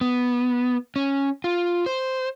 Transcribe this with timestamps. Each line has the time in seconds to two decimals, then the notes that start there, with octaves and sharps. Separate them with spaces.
0.01 B3
0.96 C#4
1.44 F4
1.86 C5